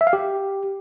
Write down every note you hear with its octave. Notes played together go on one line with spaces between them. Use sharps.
E5
F5
G4